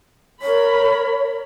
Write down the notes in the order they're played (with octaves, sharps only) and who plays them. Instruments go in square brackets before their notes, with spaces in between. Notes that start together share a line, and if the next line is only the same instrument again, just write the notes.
[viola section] A#4 B5 [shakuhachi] C#5